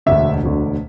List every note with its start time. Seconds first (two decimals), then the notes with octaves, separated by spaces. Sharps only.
0.06 E1 D2 D3 E5
0.43 E1 D2 D3